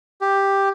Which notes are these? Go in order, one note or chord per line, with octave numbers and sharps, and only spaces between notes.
G4